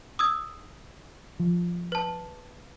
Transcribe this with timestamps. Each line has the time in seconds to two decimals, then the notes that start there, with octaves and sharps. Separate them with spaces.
0.19 D#6 E6 G#6
1.40 F3
1.92 B4 A5